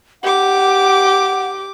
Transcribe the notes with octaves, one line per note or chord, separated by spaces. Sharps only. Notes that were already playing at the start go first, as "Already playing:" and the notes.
G4 F#5 D6